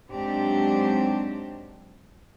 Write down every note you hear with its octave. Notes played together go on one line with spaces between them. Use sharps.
G#2 F#3 C4 D4 G4